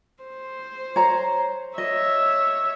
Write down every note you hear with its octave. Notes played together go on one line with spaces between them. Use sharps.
C5
C#5 A#5
C#5 D#5 E5